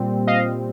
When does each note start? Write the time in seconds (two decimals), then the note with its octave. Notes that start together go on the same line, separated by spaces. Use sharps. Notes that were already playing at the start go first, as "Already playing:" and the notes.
Already playing: A#2 G3 C4
0.27 D#5 F5